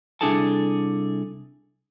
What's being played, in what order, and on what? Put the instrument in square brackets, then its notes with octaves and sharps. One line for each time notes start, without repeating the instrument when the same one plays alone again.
[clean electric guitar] C2 D4 E4 G#4 A4 A5